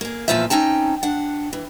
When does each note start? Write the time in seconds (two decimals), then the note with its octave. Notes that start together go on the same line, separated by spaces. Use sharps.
0.01 A#3 G#4
0.28 E2 A#2 F3 F4 C5 E5
0.50 C4 C#4 D#4 G5 A5
1.03 D4 F#5
1.53 E3